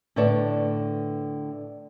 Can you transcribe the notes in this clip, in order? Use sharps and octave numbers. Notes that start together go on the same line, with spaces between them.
A2 D3 B4 C#5 D5 A5